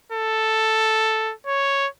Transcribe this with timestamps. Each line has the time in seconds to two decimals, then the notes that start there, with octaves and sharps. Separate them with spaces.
0.12 A4
1.47 C#5